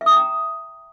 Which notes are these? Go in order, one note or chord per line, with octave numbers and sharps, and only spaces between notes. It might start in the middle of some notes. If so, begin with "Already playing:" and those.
E5
D#6
G5
A#5